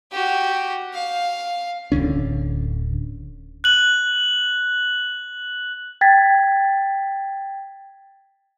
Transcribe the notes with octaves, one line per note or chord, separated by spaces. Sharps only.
F#4 G4
F5
D1 G1 D3 C#4
F#6 F#7
G5 G#6 A6 B6